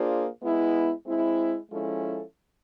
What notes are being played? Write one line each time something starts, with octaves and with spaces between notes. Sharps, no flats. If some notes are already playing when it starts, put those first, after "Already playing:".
Already playing: A#3 D4 F4 G#4 C5
G#3 B3 E4
G#3 C4 E4
F3 G#3 C#4 E4 A4